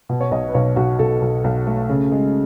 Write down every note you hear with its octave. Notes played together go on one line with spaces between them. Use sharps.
B2
C#5
B1 D#5
B4
B1 C#5
B1 F#4
B1 A4
B1
B1
A3
C#3
G#3